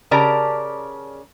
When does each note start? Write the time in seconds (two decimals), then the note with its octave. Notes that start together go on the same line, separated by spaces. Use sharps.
0.11 C#3 G4 A#4 D5 A5 A#5